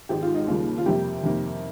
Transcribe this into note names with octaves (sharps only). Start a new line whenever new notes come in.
G#1 G#2 F3 G#3 G4
F4
D#4
D#2 C#3 G3 A#3 F4
F4
F2 C3 G3 A#3 G4
F2 C3 D#3 A#3